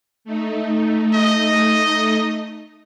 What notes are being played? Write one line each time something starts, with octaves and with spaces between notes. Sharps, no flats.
A3 D#4
D#5